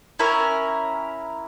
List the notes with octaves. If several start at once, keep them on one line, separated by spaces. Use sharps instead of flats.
C#4 E4 A#4